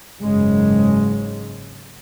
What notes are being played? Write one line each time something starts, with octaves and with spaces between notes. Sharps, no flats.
F#1 G#2 C#3 G#3